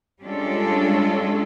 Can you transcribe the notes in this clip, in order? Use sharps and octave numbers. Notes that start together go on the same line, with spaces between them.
G3 G#3 C#4 D4 F4 A4